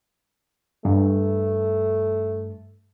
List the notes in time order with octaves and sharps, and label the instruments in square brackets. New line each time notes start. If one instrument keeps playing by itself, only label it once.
[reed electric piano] G2 [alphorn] A3